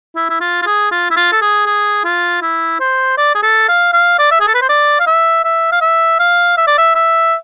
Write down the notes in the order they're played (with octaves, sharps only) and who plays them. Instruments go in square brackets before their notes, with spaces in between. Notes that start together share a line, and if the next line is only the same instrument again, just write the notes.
[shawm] E4
E4
F4
F4
G#4
F4
E4
F4
A4
G#4
G#4
F4
E4
C5
D5
G#4
A4
F5
F5
D5
E5
G#4
A4
B4
C5
D5
F5
E5
E5
F5
E5
F5
E5
D5
E5
E5